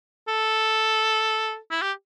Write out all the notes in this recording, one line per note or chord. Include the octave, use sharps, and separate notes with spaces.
A4
E4
G4